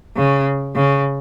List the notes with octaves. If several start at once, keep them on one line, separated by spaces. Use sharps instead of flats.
C#3
C#3